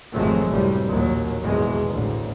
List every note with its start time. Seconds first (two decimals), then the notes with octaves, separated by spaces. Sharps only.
0.15 G#1 F2 C3 F#3 G#3 A3
0.50 A1 F#2 C3 F#3 G3
0.87 A#1 D#2 F#3
1.42 G#1 E2 B2 G#3
1.89 A1 D2